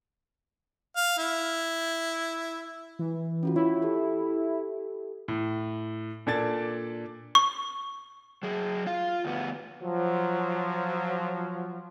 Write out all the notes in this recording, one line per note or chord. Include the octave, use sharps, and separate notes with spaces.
F5
E4
E3
C#4 F4 F#4
E4 C#5
G4 A4
A2
A#2 D4 A4 D5 G#6 A6
C#6
F#3 G#4
F4 F5
D2 B3
F3 F#3